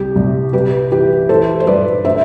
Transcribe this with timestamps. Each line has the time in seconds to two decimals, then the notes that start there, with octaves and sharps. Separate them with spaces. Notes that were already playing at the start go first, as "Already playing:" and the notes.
Already playing: C2 G4
0.16 C2
0.53 C2 G4 B4
0.91 E3 G4 B4
1.29 E3 A4 C5
1.60 C5
1.67 G2 B4 D5
2.05 D3 C5 E5